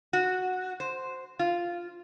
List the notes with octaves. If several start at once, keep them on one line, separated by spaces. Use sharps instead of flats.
F#4
C5
F4